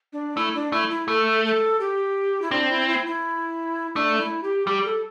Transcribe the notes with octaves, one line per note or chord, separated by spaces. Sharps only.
D4
A3 E4
D4
A3 E4
E4
A3 A4
A4
G4
E4
C4 D4
E4
E4
E4
A3 D4
E4
G4
G3 G4
A4